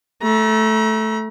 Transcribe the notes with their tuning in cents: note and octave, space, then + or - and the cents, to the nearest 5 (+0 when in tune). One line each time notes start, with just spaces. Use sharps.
A3 -5 A#5 +35